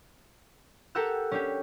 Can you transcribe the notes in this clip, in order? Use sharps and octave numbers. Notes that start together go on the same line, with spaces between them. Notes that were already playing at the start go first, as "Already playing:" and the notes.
G4 A4 A#4 F#5 E6 F#6
C#4 D4 G4